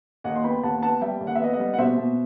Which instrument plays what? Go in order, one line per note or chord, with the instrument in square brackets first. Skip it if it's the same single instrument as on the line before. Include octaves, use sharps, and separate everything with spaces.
[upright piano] D#2 D#5 F#5
C6
B3 G5 B5
D#2 F#5 A5
B3 F#5 A5
G3 E5 G5
D#2
F#5
E5
B3 D#5 F#5
D#5 F#5
G3
F#5
B2 C5 E5
B2